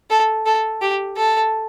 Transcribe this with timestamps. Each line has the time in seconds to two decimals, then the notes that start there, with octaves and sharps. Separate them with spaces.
0.10 A4
0.46 A4
0.82 G4
1.17 A4